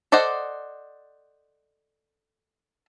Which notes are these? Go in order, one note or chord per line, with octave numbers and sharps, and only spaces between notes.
A4 C5 D5 D#5 F#5